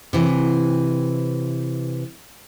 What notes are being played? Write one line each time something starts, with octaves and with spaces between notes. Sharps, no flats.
C3 E3